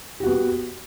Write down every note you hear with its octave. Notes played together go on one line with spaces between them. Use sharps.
B3 F#4 G4